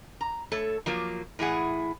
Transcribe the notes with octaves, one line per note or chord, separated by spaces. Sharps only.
A#5
A3 A4 C#5
F3 F#3 A#3 F4
A2 E3 E4 G#4 F#5